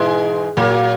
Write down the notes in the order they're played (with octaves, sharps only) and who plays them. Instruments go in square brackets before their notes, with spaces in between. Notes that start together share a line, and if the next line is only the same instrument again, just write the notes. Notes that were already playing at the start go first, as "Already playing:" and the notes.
Already playing: [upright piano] G#2 B2 [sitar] E3 G#3
[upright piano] A#2 [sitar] F#3 A#3